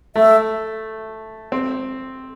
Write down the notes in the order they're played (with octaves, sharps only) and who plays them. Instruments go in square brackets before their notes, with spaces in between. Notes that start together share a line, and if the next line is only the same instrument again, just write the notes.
[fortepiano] A3 [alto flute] E5
[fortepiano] C4